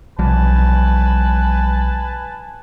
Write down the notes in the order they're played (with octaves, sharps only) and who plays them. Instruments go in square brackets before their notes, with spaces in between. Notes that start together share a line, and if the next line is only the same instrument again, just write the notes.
[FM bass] B1 [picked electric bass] C3 F3 G3 [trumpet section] B4 G#5 A5